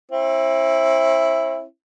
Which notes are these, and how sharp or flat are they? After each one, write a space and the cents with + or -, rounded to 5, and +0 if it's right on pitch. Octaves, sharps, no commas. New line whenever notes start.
C4 +40 E4 +0